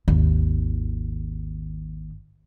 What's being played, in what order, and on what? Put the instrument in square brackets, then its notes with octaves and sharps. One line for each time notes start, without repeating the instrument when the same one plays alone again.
[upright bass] G#1 D#2